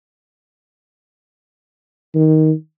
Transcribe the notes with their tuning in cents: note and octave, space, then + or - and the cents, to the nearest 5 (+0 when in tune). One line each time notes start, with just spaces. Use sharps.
D#3 +10